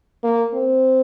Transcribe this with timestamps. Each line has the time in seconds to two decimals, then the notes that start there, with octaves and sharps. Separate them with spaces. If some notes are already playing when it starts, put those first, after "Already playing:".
0.24 A#3
0.54 C4